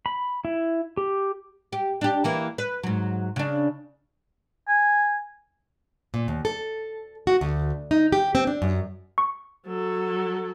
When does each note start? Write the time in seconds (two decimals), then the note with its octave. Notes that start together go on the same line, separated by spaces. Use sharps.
0.06 B5
0.45 E4
0.97 G4
1.73 G4
2.01 D4 G4
2.24 E3 A#3 E4
2.58 B4
2.83 G#2 F#3
3.36 C#3 D4
4.68 G#5
6.14 A#2
6.28 D#2
6.45 A4
7.27 F#4
7.41 D2
7.91 D#4
8.12 G4
8.35 C4
8.47 D4
8.62 F#2
9.18 C#6
9.67 F#3 A4